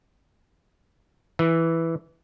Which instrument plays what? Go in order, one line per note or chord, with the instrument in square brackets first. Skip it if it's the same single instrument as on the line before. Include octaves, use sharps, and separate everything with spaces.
[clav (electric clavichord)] E3